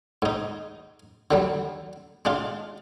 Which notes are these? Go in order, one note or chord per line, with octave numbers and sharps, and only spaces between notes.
G#2 D#4
D3 F#3 G3
G#3 D4 F4